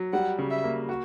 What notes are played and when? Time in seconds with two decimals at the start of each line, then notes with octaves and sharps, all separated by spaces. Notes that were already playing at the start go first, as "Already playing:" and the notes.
Already playing: F#3
0.13 G3 F#5
0.38 C#3
0.51 E5
0.64 A#3
0.89 F#4